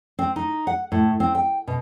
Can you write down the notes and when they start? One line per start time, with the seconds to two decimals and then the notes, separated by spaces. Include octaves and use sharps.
0.19 C4
0.36 D#4
0.67 F#5
0.92 A2
1.20 C4
1.35 G5
1.68 B2